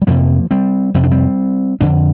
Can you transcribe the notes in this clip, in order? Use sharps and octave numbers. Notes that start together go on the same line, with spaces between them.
G3
F2 C3 F3 A#3
G3 C4
F2 C3 C4
D4
G3 C4
F2 D3 D4